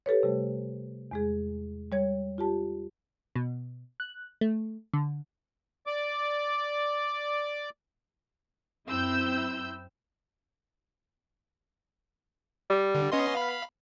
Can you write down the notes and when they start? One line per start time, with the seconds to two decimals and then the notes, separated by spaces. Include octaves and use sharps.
0.06 G4 A4 B4 C#5
0.23 C3 G3 A3
1.11 E2 G#3 G#4
1.92 G3 C#5 G#6
2.38 F4 G4 A5
3.36 B2
4.00 F#6
4.41 A3
4.93 D3
5.87 D5 D6
8.87 F#2 C4 E4 E6 G6
12.70 G3
12.95 D3
13.12 B3 C#4 D#5 C6
13.35 F5 B5